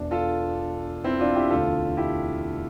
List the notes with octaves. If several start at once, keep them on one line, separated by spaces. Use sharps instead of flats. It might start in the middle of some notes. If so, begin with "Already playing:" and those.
Already playing: E1 E2 B2 D4
F4 A4
C4 E4
D4 F4
E4 G4
E1 D2 D3 F4 A4
E4 G4